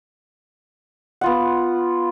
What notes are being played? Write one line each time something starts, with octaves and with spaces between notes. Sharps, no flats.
B3 F4 F#5